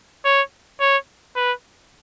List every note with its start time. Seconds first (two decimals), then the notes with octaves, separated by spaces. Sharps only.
0.25 C#5
0.80 C#5
1.36 B4